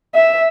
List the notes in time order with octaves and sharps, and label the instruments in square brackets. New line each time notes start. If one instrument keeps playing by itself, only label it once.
[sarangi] E5